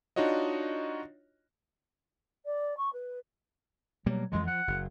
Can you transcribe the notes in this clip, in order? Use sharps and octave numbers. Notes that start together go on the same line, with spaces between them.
D4 D#4 F4 F#4 C#5 D#5
D5
C#6
B4
B2 F#3 G3 A#3
F2 E3 F#3 G#3
F3 F#5
F#1